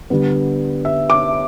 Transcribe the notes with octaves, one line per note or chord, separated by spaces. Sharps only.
D3 G3 B3
E5
D6